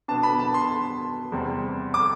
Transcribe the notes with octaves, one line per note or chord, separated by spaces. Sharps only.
B2 B3 D4 A5
B5
A5
C6
E2 C3 G3 C4
D6